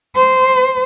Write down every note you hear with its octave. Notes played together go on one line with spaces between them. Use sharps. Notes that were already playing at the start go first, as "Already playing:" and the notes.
C5